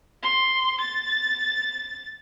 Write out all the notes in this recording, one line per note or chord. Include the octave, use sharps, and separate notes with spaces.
C6
A6